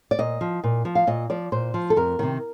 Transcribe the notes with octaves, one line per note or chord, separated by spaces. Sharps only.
D5
A#2 D#5
F3
A#2
F3
F5
A#2 D#5
F3 D5
A#2 C5
F3
A4
F2 A#4
C3 D#3